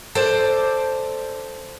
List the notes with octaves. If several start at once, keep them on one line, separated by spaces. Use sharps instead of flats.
A4 C5 D5 A5